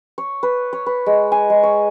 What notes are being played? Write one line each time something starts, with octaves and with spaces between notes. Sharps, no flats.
C#5
B4
C#5
B4
G#3
G#5
G#3
C#5